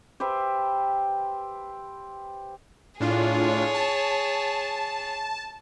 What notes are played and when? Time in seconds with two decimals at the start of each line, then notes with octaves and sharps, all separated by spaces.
0.20 G4 B4 C5 E5
3.00 A2 D4 F4 G#4 C#5
3.74 A5